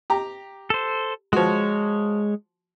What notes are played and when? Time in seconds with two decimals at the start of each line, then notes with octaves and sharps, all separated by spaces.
0.10 G4 A#5
0.70 A4 C5
1.33 F3 G#3 F#4 C#5